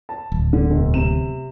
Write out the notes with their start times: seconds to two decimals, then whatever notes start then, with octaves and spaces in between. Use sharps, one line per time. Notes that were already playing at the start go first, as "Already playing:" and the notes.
0.09 A5
0.32 D1
0.53 D3
0.70 E1
0.94 C3 E7